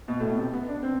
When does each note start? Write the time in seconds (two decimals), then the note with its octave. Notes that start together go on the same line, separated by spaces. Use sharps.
0.08 B2
0.20 A2
0.29 B2
0.37 C3
0.53 B3
0.69 D4
0.83 C4